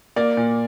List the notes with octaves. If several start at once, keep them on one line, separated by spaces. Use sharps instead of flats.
A#3 D5
A#2